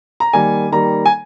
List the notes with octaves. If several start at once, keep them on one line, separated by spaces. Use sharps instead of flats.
A#5
D#3 G3 A#3 G#5
D#3 G3 A#3 A#5
G#5